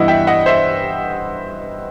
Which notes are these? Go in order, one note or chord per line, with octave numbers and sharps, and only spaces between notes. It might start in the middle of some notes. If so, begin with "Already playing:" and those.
Already playing: G2 E3 B3 E4 D#5 F#5
E5 G5
D#5 F#5
C5 E5